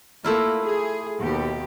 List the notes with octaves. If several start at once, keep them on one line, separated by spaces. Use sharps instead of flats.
A3 A#3 E4 F4
G#4
D#2 B2 G4